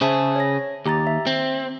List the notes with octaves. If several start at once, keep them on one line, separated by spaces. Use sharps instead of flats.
C#3 G#4 C5 E5 A5
C#5 A#6
D#2 G4 A#5 A6
E5
C4